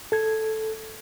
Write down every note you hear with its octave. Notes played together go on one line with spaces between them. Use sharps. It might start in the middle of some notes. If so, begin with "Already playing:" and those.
A4 G#6